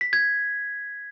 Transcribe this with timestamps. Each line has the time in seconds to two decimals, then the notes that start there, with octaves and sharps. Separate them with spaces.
0.01 B6
0.13 G#6